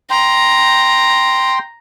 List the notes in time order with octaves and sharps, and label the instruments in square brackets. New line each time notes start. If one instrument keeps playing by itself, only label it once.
[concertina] G5 C6 [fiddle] A#5